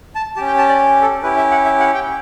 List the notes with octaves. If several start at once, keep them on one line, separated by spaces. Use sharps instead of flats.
A5
C#4 G4 A5
G5
A5
D5
A4
C#4 E4 G4 B4
E5
F#5
E5
F#5
G5